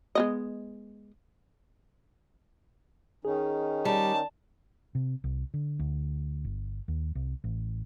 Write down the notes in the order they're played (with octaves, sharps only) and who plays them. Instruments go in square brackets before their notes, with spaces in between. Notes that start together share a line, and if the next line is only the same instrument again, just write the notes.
[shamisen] G#3 B3 D#5
[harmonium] D#3 C#4 D#4 [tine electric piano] G#4
[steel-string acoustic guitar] G3 [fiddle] A5
[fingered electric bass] C3
C2
D3
D2
G1
D#2
C2
A1